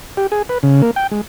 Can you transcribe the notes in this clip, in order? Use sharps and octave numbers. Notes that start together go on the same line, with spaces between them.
G4
G#4
B4
C#3
A#3
G5
G#3